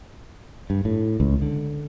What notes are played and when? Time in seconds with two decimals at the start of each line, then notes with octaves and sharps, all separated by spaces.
0.70 G2
0.85 A2
1.20 C#2
1.42 D3